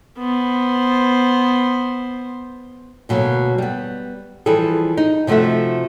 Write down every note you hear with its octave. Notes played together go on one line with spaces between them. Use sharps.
B3 C5
D2 B2 F#3 A#3
G3 B3
E3 F3 G3 G#4 A4
D#4
C3 F3 A3 F#4 E5